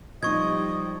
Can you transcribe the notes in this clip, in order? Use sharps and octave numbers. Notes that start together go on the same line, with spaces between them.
F3 G3 D#4 D#5 C#6 G#6